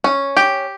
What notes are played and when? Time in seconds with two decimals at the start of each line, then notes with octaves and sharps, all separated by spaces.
0.04 C#4
0.37 G4